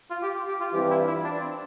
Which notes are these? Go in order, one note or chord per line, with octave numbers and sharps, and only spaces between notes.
F4
G4
G4
F4
G2 E3 G3 C4 F4 G4
E4
E4
D4
C4